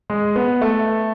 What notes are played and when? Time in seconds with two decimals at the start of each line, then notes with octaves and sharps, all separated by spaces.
0.10 G#3
0.36 B3
0.61 A3